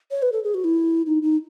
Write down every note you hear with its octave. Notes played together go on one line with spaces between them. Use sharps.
C#5
B4
A4
G#4
F#4
E4
D#4
D#4